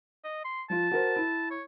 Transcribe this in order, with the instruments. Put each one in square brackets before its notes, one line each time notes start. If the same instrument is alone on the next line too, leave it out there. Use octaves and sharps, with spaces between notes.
[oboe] D#5
C6
[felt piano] F3 F4 [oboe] A5
[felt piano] F#4 A#4 C5
E4
[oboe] C#5